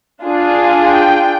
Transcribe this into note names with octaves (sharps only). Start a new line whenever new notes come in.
D4 F4 G#4
G5